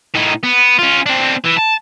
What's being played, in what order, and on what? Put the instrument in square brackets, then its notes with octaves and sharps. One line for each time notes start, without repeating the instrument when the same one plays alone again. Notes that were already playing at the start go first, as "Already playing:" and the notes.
[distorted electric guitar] A2 D#4
B3
C#4 F4
C4 D4
E3
A5